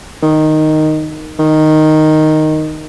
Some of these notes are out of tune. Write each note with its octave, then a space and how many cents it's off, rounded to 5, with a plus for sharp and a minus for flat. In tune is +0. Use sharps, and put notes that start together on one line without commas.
D#3 -5
D#3 -5